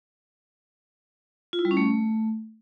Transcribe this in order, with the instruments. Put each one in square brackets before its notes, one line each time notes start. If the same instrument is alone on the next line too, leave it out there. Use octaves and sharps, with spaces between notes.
[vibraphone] F4
E4
G3
C#4
A3